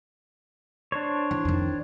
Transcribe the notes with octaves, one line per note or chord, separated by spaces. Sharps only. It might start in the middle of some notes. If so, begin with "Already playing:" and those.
D4 C5 C#5
E3 E4
F2 D#3